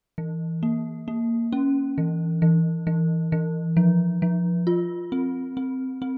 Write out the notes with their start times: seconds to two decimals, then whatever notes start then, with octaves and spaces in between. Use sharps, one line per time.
0.18 E3
0.63 A#3
1.08 A#3
1.52 C#4
1.98 E3
2.42 E3
2.87 E3
3.32 E3
3.77 F3
4.22 F3
4.67 F4
5.12 C4
5.57 C4
6.02 C4